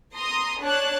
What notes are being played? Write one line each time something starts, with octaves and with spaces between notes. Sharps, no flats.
A#5 C6 D#6
D4 C#5 A5 F#6